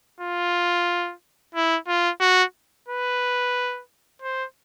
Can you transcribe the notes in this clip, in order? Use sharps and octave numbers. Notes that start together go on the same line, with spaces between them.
F4
E4
F4
F#4
B4
C5